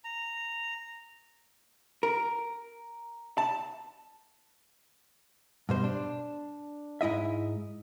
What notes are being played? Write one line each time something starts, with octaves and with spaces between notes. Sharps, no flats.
A#5
A#4
A5
G2 B2 C5
D4
G#2 E4 D#5 E5